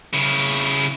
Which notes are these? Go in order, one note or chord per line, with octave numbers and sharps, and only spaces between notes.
C#3 E4